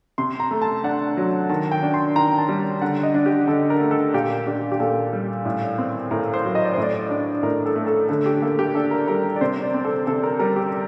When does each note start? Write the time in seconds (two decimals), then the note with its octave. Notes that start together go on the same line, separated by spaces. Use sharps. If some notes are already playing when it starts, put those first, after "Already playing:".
0.18 C3 C6
0.40 A#5
0.51 A3
0.62 A5
0.84 D4 F#5
1.17 F#3
1.49 D#3 A5
1.72 G5
1.82 D4
1.94 C6
2.16 D#3 A#5
2.38 A5
2.49 G3
2.82 D3 F#5
3.03 D#5
3.14 D4
3.26 G4
3.47 D3 A4
3.70 A#4
3.80 A3
3.91 A4
4.13 A#2 G4
4.46 D4 G4
4.72 G4
4.80 A#2 A4
5.13 G3
5.45 A2
5.78 C4
6.11 A2 A#4
6.34 C5
6.45 F#3
6.55 D#5
6.64 D5
6.73 A2 C5
6.83 D5
7.10 D4
7.43 A2 A#4
7.66 A4
7.76 A3
7.87 A4
8.09 D3 A4
8.26 G4
8.42 A#3 A4
8.59 G4
8.75 D4 A4
8.91 A#4
9.08 G3 A#4
9.36 D5
9.41 C3 C5
9.63 D5
9.74 C4
9.84 A4
10.07 C3 A4
10.23 A#4
10.39 G3 A#4
10.56 G4